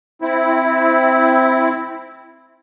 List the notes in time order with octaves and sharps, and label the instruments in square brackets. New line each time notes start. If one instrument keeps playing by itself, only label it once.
[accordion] C4 E4